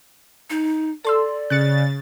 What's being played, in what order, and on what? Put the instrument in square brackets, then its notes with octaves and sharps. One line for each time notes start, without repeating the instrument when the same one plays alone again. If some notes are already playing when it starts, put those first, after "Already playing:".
[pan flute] D#4
[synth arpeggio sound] A4 C6 E6 [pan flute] D5
[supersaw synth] C#3 A6 [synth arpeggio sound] F#6 C#7